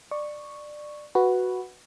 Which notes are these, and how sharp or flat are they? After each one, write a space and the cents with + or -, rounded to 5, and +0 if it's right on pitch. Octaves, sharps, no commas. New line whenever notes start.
D5 +20 C#6 +0
F#4 +0 B4 +0